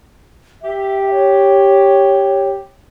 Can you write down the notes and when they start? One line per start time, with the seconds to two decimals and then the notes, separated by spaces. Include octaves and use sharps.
0.62 G4 E5
1.10 C#5